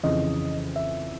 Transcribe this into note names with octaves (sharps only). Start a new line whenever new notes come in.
F2 C#3 E3 D#5
E5